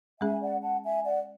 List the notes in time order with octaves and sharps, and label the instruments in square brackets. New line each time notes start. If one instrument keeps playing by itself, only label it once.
[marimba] G#3 C#4 G#4 [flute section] E5 G#5
[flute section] D5 F#5
F#5 A5
E5 G#5
D5 F#5